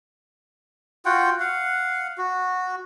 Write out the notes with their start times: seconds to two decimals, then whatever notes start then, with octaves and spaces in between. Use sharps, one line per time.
1.05 F4 F#4 F#5 G5
1.40 F5 F#5
2.18 F#4